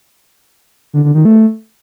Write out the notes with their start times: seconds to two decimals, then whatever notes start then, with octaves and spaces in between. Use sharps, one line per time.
0.93 D3
1.04 D3
1.15 D#3
1.25 A3